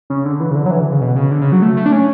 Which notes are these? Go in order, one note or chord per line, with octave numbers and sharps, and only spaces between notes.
C#3
D3
E3
C#3
D3
F#3
E3
D3
C#3
B2
C#3
D3
C#3
F#3
A3
A3
D4
C#4